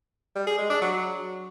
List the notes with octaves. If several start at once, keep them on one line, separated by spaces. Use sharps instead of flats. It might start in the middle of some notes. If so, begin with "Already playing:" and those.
G3
G#4
G#3
D4
F#3